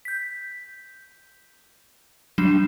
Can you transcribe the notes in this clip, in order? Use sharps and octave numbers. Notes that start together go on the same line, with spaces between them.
G6 B6
F#3 G3 D4 C7 E7